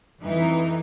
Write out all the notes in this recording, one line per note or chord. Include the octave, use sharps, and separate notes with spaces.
F2 E3 D#4